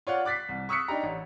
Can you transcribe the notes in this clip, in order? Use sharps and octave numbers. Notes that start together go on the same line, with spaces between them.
F4 C#5 D5 F#5
D6 F#6 A6 B6 C7
C2
C#6 D#6 E6 F#6 B6 C#7
D4 D#4 G4 A#5
A1